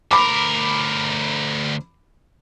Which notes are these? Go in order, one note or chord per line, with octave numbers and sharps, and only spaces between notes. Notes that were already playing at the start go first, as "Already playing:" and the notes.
D2 A#4 B5 D6